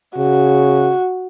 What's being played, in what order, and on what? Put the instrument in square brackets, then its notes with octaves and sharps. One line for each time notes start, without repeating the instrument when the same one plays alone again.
[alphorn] C#3 [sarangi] F#4